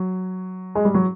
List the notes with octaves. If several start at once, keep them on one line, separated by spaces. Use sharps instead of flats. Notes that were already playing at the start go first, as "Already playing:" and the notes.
Already playing: F#3
G#3
G3
F#3